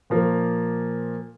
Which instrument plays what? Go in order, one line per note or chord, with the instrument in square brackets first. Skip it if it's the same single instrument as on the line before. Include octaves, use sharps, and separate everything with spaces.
[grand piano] A#2 F3 A#3